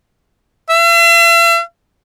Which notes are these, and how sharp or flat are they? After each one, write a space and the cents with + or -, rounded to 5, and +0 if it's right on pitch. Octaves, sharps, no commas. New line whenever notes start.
E5 +45